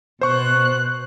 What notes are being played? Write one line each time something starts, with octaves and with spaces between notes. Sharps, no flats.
B2 C5 C#6 F#6